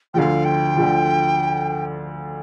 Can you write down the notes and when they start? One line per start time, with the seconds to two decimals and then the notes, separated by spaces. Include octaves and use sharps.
0.14 D2 D3 F3 F5 G5
0.45 G5
0.76 D2 D3 F3